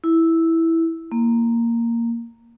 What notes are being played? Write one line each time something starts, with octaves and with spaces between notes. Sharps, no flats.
E4
A#3